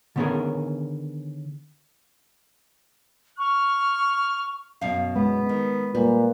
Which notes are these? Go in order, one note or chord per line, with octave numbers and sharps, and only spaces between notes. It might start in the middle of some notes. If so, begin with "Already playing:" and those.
D3 D#3 B3 C#4 G#4 A#4
C#6 F6
F#2 B2 F5
G#3 B3
D#3
A#2 G3 B4